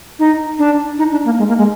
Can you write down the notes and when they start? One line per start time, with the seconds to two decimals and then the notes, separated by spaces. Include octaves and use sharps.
0.19 D#4
0.59 D4
0.98 D#4
1.12 D4
1.25 A#3
1.38 G#3
1.48 A#3
1.58 G#3